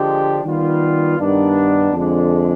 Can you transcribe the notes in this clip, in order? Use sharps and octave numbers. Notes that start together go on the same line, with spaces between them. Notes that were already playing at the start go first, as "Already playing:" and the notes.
Already playing: D3 F3 G#3 D4 G4
D#3 G3 B3 F4
G2 D#3 B3 D4
F2 D3 G#3 D4